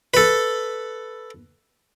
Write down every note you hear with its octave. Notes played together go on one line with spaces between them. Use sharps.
A4 B4